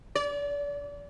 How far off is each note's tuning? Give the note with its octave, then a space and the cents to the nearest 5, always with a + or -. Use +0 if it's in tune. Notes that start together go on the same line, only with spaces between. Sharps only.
D5 -35